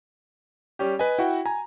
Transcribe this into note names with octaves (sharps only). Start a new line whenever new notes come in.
G3 C#4 G4
B4 D#5 G#5
E4 F#4 F#5 G5
G#5 A#5